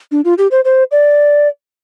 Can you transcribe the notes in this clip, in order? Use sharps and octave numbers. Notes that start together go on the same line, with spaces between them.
D4
F4
G4
C5
C5
D5